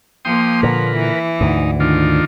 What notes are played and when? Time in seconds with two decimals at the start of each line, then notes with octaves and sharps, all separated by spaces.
0.25 F3 A#3 G5 C6 D#6
0.63 A#2 D3 A#4 B4
0.96 E3
1.41 D2 G#2 D#4
1.80 D#3 D4 F4